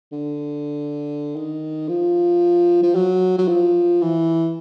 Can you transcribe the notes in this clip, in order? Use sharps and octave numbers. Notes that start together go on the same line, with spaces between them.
D3
D#3
F3
F3
F#3
F#3
F3
E3